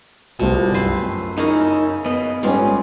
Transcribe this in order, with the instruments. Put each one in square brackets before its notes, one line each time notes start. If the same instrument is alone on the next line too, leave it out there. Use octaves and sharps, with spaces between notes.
[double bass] C2 [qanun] B2 [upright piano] F3 A3
[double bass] F#2 [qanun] C4 B4 C6
[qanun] C#3 E4 A#5 [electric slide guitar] D#4 [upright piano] A#4 C#6 F6
[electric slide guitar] B3 B4 D#5
[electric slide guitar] G#2 [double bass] G3 C#4 [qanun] A3 F4 [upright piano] B4